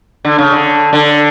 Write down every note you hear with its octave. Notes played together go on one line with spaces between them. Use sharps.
D3
C#3
D3
D3